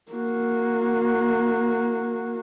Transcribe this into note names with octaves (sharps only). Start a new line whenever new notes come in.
A#3 F#4